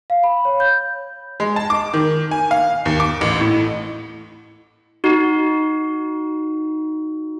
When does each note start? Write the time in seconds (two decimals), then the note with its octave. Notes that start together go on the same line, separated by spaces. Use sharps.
0.10 F5
0.24 B5
0.45 C#5
0.60 G6
1.40 G#3
1.56 A5
1.70 D6
1.94 D#3
2.31 G#5
2.51 F5
2.86 D#2
3.00 D6
3.21 A1
3.40 A2
5.04 D#4 F#4